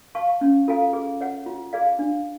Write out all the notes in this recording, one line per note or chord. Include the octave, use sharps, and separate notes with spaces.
F5 A5 C#6
C#4
F4 A4 F5 G#5
G#4
C#5 F#5
F4
G#4 D5 F5
D4